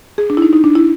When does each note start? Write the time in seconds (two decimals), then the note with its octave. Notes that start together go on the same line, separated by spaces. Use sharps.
0.18 G#4
0.30 D4
0.37 E4
0.42 D#4
0.53 D#4
0.64 D4
0.76 E4